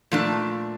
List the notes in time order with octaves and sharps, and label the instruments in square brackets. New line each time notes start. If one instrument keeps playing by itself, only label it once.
[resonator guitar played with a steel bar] A#2 F3 A3 D4